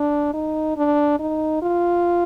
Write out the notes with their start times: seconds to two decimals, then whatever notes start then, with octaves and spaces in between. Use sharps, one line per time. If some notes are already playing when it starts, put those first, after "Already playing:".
Already playing: D4
0.34 D#4
0.77 D4
1.20 D#4
1.62 F4